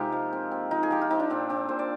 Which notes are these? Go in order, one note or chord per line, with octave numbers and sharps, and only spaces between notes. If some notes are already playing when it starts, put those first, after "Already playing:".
Already playing: C3 G#3 A#3 C4 D#4 F4 G4
F3
C4
C4
F3 D#4
G#4
F3 G4
F4
C4 D#4
D4
A#2 C4
C4 D4
A#2 C5
D5